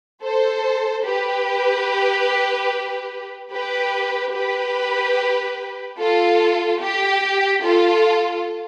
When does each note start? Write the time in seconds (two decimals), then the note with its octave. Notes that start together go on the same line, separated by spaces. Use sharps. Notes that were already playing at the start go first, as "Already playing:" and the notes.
0.22 A4 C5
1.04 G4 B4
3.51 G4 B4
4.34 G4 B4
5.98 F4 A4
6.81 G4
7.63 F4 A4